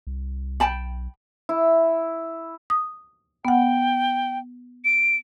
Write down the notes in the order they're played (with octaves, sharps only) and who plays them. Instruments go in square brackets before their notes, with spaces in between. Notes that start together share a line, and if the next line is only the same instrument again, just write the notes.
[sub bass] C2
[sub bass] B1 [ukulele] G5 A5 B5
[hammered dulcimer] E4
[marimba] D#6
[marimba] B3 F#5 [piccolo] G5
[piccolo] D7